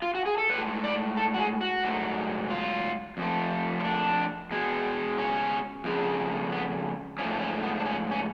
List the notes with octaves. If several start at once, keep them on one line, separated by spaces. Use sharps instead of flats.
F4
F#4
G#4
A4
A2 G#3 B4
D5
A4
F#4
G#4
F#4
G#2 F#3 A3
F4
F2 F3 A3
F4
D4
B2 G#3
C#4
F2 C#3 G#3
B3
G#2 F3 A3 C#4
C#4
B3
D4
C#4
C#4